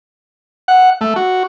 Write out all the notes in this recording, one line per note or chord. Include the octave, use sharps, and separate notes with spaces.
F#5
A3
F#4